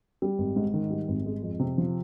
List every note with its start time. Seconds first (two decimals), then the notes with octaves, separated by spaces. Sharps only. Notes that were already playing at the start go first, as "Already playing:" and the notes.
0.22 G3
0.38 G#1
0.56 G#2
0.74 D#3
0.90 G3
1.08 G#1
1.26 G#3
1.43 F2
1.59 C3
1.78 F3